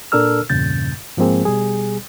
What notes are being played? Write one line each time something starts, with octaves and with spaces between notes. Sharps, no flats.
A#2 D4 A4 A#4 E6 F6
E2 G2 A#2 C#3 G6 A6
G#2 F3 G#3 A#3 C4 G#4
B2 G3 G#4